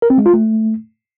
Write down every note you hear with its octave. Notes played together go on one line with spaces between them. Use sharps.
A#4
C4
G#3
F4
A3